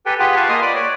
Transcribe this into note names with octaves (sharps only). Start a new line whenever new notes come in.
G4 A4 B4 G5 G#5
F4 G4 G#4 B4 F#5 G5
B4 F5 A5 C#6
A#3 F4 D#5 F5 D#6 F6
D5 B5 D6
C#5 D5